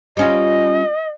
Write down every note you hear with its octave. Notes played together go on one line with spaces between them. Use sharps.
G3 C#4 F4 D#5